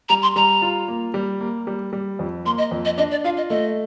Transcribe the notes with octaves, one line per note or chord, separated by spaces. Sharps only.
G3 A#5
C6
G3 A#5
F4
A#3
G3
A#3
G3
G3
F2
A#3 C6
D#5
F2
D#5
D4 D#5
D5
F4 F5
D#5
A3 D#5